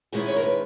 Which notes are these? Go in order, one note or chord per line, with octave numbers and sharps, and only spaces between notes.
G#2 D#3 G#3 C#4 E4 G#4
C#5
A#4
B4